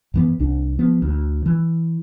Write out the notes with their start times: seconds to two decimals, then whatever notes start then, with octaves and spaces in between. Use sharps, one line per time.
0.14 F#2 E3 B3
0.40 C2 D4
0.79 F3 B3
1.02 D2
1.46 E3